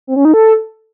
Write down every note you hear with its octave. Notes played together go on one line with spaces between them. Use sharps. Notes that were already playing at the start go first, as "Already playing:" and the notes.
C4
C#4
D#4
A4